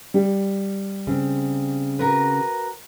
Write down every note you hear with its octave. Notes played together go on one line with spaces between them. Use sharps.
G3
C#3 C4
F#4 A#4 B4